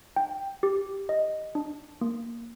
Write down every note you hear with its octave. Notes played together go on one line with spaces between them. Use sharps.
G5
G4
D#5
D4
A#3